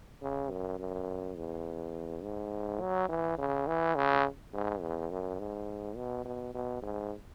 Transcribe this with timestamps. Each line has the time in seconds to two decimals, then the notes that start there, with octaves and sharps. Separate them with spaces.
0.23 C#3
0.51 F#2
0.79 F#2
1.37 E2
2.23 G#2
2.81 F#3
3.09 E3
3.38 C#3
3.67 E3
3.96 C#3
4.53 G#2
4.82 E2
5.11 F#2
5.40 G#2
5.96 B2
6.25 B2
6.54 B2
6.83 G#2